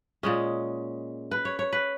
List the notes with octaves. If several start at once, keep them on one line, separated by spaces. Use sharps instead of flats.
A#2 G#3 C#4 D#5
B4
C#5
C#5
B4